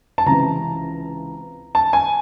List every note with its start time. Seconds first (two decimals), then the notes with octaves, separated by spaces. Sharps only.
0.18 A5
0.26 C#2 C3 E3 A#5
1.75 A5
1.93 G#5